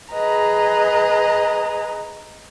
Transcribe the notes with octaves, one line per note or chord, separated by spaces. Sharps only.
G#4 B4 D#5 A#5